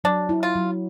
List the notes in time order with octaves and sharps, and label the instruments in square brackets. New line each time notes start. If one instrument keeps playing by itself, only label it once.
[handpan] F#3 [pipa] D4
[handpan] E4
[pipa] F4
[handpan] F#3